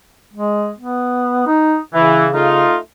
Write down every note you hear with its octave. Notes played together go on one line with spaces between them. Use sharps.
G#3
B3
D#4
C#3 E3
A3 D#4 F4